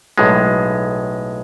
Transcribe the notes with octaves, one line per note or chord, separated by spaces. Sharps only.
B1 A2 G#3